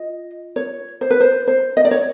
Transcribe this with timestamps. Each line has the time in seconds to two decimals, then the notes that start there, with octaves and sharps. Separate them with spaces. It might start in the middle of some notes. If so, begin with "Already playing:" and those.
Already playing: F4 D#5
0.56 C#5
1.01 C5
1.11 B4
1.21 C5
1.48 C5
1.77 D#5
1.85 D5
1.91 C#5